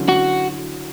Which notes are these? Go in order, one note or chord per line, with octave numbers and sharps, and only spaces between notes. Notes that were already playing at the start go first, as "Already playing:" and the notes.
Already playing: D3 F#3 C#4 E4
F#4